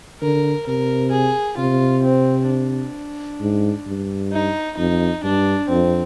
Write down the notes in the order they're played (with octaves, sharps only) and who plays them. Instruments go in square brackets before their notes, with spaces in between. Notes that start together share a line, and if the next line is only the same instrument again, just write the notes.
[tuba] D3 [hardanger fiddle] A#4
[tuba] C3 [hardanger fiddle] A#4
[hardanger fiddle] G#4
[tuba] C3 [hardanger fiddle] F4
[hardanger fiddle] C4
D4
[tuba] G#2
G2
[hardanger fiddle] D#4
[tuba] F2 [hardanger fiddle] D#4
[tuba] G2 [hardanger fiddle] D4
[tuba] F2 [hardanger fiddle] C4